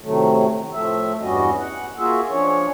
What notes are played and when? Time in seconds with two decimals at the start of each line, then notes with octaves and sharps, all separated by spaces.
0.01 A2 C3 D#3 F#3 A3
0.73 A2 F3 A3 E5
1.20 E2 G2 G3 C#4 F#4 D#5
1.60 F#5
1.98 A#3 F4 F#4 G#4 E5
2.30 F3 C#4 D4 C#5